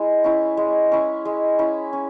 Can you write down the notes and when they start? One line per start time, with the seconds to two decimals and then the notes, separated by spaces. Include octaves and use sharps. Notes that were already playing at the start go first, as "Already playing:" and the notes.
Already playing: G#3 E4
0.24 C#4 E4
0.57 G#3
0.92 C#4 E4
1.25 G#3
1.59 C#4 E4
1.93 C#4